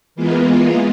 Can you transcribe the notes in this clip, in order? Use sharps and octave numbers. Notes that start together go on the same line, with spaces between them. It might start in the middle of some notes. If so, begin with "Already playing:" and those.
E3 G#3 A#3 B3 F4